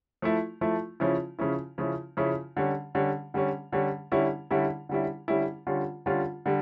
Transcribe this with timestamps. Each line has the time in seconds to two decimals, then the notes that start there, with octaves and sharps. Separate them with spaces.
0.22 F3 A3 E4
0.61 F3 A3 E4
1.00 C#3 F3 C#4 E4
1.39 C#3 F3 C#4 E4
1.78 C#3 F3 C#4 E4
2.17 C#3 F3 C#4 E4
2.57 D3 G3 C#4
2.95 D3 G3 C#4
3.34 D3 G3 C#4
3.72 D3 G3 C#4
4.12 D3 G3 C#4 E4
4.51 D3 G3 C#4 E4
4.89 D3 G3 C#4 E4
5.28 D3 G3 C#4 E4
5.67 D3 G3 C#4 F4
6.06 D3 G3 C#4 F4
6.46 D3 G3